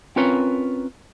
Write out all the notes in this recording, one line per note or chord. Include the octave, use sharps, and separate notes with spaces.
C4 C#4 F4 A#4 B4 C#5